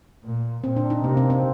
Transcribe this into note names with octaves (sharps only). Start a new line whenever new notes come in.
A#2
A#2 C4
D4
D#4
C3 A#3
C4
C4